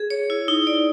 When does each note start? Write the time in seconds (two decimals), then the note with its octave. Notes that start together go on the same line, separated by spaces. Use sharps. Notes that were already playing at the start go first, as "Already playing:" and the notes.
Already playing: G#4
0.10 C#5
0.30 E4
0.48 D#4
0.67 D5